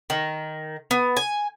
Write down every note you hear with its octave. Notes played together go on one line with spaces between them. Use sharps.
D#3
B3
G#5